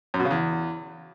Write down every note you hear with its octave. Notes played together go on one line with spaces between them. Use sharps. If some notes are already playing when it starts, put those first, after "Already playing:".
F#2
B2
C#3
E2